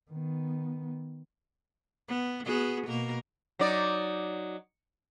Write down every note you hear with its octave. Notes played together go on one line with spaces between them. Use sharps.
D#3 B3
B3
B3 F#4 G#4
B2 A#3 A#4
F#3 D#4 D5